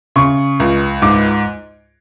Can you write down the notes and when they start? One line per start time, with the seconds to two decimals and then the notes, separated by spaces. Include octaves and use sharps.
0.16 C#3 C#6
0.60 C#2
1.02 G#2 D6